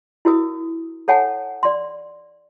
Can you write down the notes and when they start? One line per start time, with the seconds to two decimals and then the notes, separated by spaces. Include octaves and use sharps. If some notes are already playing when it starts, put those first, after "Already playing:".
0.25 E4 F#4 A#4 D#6
1.08 A4 C#5 F#5 G#5 A5
1.63 D5 C6